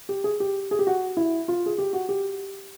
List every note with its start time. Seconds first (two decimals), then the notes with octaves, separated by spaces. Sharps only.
0.09 G4
0.24 G#4
0.40 G4
0.71 G#4
0.79 G4
0.87 F#4
1.17 E4
1.48 F4
1.66 G#4
1.78 G4
1.93 F#4
2.09 G4